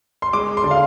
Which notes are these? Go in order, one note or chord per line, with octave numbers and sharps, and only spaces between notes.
C6
G#3 D6
C6
D3
F5